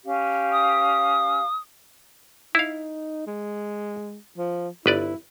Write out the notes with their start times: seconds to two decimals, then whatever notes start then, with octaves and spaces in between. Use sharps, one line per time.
0.04 C#4 G4 F5
0.52 D#6
2.55 D#4 E4 F5
3.27 G#3
4.38 F3
4.86 G1 E4 B4 D5